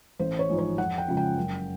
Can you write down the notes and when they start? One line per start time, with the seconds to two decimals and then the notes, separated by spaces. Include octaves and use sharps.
0.19 A1 C5
0.39 C#5
0.49 G#2 F3 G#3
0.58 C#5
0.78 F2 F#5
0.98 G5
1.07 C#3 F3 G#3
1.17 G5
1.37 F#1